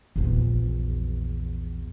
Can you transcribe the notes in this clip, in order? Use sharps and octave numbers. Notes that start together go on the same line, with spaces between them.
A#1 E2